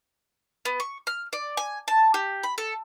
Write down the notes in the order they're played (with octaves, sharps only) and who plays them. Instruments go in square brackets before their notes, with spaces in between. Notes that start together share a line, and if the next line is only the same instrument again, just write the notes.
[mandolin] B3
C#6
F6
D5
G#5
A5
G4
B5
A4